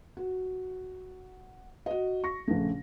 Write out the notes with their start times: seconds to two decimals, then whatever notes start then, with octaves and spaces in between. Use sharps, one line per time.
0.17 F#4
1.86 F#4 D#5
2.24 C#6 A#6
2.48 A#1 C#3 A3